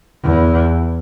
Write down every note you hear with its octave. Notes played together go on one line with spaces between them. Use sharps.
E2